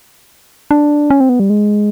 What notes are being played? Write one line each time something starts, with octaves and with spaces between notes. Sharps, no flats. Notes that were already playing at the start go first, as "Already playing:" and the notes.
D4
C#4
C4
B3
G3
G#3